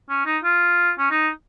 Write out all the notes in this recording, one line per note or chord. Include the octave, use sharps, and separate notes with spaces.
C#4
D#4
F4
C#4
D#4